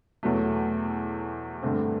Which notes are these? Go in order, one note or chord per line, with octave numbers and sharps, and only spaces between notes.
E2 B2 F#3 A3
G2 D3 A3 C4